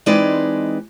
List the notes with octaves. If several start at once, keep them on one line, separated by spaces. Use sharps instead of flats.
E3 G#3 C4 D#4 B4 D5